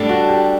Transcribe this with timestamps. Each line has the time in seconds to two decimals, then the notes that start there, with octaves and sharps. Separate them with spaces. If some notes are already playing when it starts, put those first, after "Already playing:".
Already playing: A2 G3 D4 A4
0.09 F#4
0.29 G4